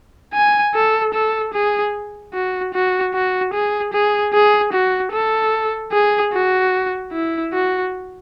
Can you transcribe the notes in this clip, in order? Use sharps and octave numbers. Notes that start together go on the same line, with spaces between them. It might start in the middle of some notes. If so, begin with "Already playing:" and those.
G#5
A4
A4
G#4
F#4
F#4
F#4
G#4
G#4
G#4
F#4
A4
G#4
F#4
E4
F#4